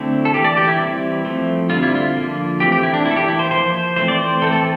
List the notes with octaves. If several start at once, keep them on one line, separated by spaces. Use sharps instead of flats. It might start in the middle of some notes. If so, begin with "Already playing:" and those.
Already playing: D3 A3 C4 E4
A4
E3 A#3 G4
D5
G4
E4
E3 G3 C4
F3 A3 C4
D3 G3 C4 F4
E4
F4
D3 F3 A#3
E3 A3 C4 G4
G4
E4
D4
E3 A#3 E4
A4
G4
E4
C5
F3 A#3 C5
C5
E3 A3 C4 C5
D5
C5
E3 A3 C4 A4
A4